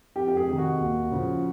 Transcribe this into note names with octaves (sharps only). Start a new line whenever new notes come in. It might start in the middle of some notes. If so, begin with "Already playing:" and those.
F2 G4
G4
G#4
C3 D#3
F#4
D#2
C#3 F3